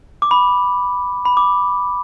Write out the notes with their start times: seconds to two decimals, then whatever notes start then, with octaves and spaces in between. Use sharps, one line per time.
0.22 D6
0.31 B5
1.25 B5
1.37 D6